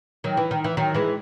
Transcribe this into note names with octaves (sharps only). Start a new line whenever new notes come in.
D#3 F#3
E3
D#3
E3
D#3 F#3
E3 G#3